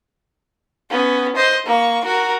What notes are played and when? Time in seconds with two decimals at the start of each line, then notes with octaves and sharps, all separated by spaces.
0.91 B3 C#4
1.36 C5 D#5
1.67 A#3 C#6
2.05 F#4 A#4